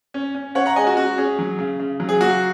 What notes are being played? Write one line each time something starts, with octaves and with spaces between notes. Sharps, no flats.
C#4
C#4
C#4 C#5 F#5
F#5 A#5
G#3 D#5 G#5
F#4
C#4 F#4
C#4 G#4
F#3
C#3
C#3
F#3
G#4
A#3 F#4